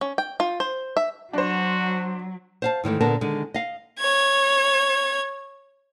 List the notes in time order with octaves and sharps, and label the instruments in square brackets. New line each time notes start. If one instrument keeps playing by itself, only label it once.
[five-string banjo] C#4
G5
F4
C5
E5
[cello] F#3 [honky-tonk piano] D4 C5 [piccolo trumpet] F#4
[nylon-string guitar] C5 F5 A5
G#2 D#3 E3 A3
A#2 D3 B3 A#4 A5
D3 D#3 G#3
D#5 F5
[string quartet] C#5 G#6